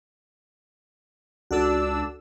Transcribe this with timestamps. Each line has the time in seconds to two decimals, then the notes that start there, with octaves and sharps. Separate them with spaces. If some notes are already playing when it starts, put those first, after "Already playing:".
1.51 C#2 D4 F#4 A4 D5 E6